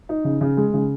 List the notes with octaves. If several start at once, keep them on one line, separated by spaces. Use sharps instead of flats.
D#4
C#3
C#3
G#3
C#3